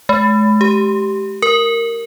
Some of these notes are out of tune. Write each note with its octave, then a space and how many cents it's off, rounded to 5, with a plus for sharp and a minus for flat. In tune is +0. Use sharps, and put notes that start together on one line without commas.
G#3 +40
G4 -10
A#4 -10